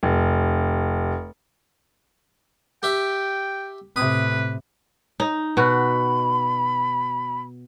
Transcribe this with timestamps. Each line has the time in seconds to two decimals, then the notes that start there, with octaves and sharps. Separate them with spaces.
0.03 F1
2.83 G4 E5 G5
3.96 A2 C3 B4 D#6
5.20 D#4
5.57 B2 F#4 B5